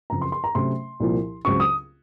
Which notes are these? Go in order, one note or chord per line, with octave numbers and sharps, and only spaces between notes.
F#2 C#3 F3 C4 A#5
C6
C6
A#5
C3 F#3 A3 C#4 C6
C2 A#2 F3
C#2 C#3 F#3 C4 C#6
D#6